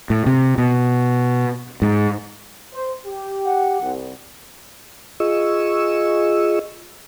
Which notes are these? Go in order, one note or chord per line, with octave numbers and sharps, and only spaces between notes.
A2
C3
B2
G#2
C5
G4
F#5
C2
F4 G#4 D#5 C#6 E6